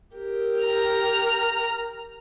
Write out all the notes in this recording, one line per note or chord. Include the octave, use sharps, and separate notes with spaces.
G4 A#4
A#5 F6